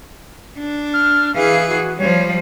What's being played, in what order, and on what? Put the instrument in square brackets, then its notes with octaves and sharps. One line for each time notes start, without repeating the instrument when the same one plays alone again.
[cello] D4
[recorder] F6
[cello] E3 G#4 [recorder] F5
[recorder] F#4
[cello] F3 G3 [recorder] C#5